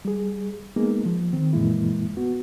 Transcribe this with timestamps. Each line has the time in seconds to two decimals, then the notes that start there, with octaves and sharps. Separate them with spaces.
0.05 G3 G#4
0.76 G#3 A#3 B3 D#4 G#4
1.06 F3
1.33 D#3 C4
1.53 F#2 A#2 E3 G#3 A#3 E4
2.17 B3 F#4